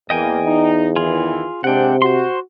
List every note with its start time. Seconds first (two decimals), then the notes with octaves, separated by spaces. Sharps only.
0.10 E2 E3 A#3 D#5 G5 G#5
0.45 D#4
0.96 D#3 E3 F4 G#4
1.64 C3 G#3 C4 D4 F#5 G5
2.02 F#4 C5 C6